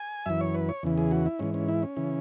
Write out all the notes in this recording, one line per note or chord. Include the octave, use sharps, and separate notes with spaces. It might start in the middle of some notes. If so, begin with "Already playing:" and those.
Already playing: G#5
F#2 E3 E5
C#5
B4
C#5
E2 C#3 E3
G#4
F#4
E4
G#2 E3 C#4
C#4
E4
C#4
C#3 E3